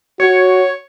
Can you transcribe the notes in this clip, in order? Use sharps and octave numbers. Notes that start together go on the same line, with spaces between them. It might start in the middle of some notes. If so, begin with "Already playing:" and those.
F#4 C#5